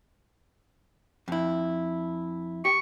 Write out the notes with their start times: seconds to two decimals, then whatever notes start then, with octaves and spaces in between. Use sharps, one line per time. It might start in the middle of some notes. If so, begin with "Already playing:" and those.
1.28 F2 E4
2.65 G4 C#6